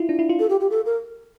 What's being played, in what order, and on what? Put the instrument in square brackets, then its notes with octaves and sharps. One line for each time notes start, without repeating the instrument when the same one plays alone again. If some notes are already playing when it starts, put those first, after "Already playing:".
Already playing: [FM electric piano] E4 F4
D4
E4
F4
[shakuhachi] A4
G4
G4
A4
A#4